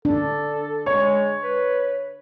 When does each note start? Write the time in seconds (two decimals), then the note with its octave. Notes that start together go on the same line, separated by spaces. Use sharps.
0.05 D4 A4
0.86 G#3 C#5
1.43 B4